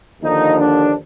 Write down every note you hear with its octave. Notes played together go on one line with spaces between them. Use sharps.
D#2 D3 F3 D#4
D4